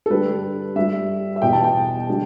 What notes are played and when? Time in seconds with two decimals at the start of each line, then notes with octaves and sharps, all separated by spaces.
0.06 A4
0.10 G2 D3 G3 B4
0.75 G2 G3 E5
1.36 E5
1.42 E2 B2 G3 G5
1.53 A5
1.64 G5
2.09 D3 G3